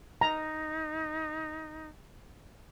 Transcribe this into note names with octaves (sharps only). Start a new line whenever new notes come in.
D#4 A#5